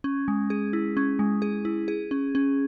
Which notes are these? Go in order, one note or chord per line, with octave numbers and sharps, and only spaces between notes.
C#4
G#3
G#4
E4
C#4
G#3
G#4
E4
G#4
C#4
C#4